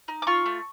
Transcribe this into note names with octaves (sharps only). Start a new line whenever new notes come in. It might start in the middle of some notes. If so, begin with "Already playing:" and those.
D#4
D6
F4 C#6
A3